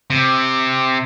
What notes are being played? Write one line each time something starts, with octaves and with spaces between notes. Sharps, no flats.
C3